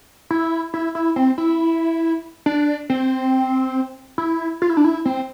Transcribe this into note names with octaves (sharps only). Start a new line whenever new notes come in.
E4
E4
E4
C4
E4
D4
C4
E4
F4
E4
D4
E4
C4